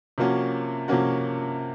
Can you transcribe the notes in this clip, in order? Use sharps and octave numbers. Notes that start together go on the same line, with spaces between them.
C3 F3 A#3 C#4 F#4
C3 F3 A#3 C#4 F#4